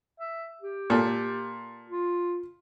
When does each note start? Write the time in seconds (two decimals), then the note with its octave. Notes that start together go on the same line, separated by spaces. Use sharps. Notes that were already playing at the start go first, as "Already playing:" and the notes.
0.20 E5
0.61 G4
0.90 A#2 A4
1.90 F4